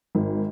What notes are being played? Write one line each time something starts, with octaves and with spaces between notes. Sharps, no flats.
G#1